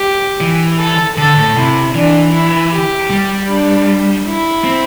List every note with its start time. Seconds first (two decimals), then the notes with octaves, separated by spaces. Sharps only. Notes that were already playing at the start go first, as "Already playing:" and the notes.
Already playing: G4
0.41 E3
0.80 A4
1.18 D3 A4
1.37 A2
1.57 C3 E4
1.95 E3 D4
2.34 E4
2.72 G4
3.10 G3
3.50 D4
4.26 E4
4.64 C4